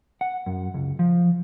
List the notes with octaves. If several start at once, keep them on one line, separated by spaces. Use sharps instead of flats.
F#5
F#2
C#2
F3